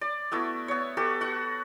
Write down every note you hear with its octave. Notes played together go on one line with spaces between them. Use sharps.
D5
A3 B3 E4 F#4
B3 C#5
F#4 G4 A4 B4
F#4 F#5